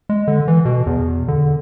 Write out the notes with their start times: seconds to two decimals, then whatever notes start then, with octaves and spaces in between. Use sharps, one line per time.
0.09 G#3
0.28 D3
0.48 E3
0.65 B2
0.86 E2
1.28 D3